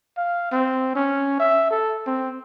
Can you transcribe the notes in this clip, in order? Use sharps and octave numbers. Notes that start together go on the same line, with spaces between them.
F5
C4
C#4
E5
A4
C4